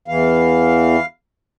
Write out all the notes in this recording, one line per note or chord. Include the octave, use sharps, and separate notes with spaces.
E2 E3 F5